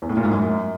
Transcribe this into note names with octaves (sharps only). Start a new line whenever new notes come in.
E2
A2
A#2
G#2
F#2